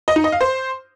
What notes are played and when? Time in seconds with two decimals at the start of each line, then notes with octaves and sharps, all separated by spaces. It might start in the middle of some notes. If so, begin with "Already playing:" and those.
0.08 D#5
0.16 D#4
0.24 D#5
0.32 F5
0.41 C5